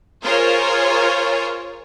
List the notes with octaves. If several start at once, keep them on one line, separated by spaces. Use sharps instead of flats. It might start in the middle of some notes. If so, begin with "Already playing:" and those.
F4 G#4 A#4 C5 C#5